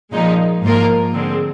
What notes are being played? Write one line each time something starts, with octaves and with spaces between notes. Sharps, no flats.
A#2 F3 G#3 D#4
G#2 F3 A#3 F4 A#4
D3 G#3 C4